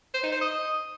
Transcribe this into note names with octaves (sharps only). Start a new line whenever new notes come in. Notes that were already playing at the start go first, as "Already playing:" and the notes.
C5
D#4
C5
D#5